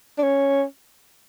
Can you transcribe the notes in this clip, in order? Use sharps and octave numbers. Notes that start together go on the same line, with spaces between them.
D4
C#4